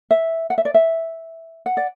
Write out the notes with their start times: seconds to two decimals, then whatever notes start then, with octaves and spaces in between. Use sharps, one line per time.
0.11 E5
0.50 F#5
0.58 E5
0.65 D5
0.74 E5
1.66 F#5
1.77 D5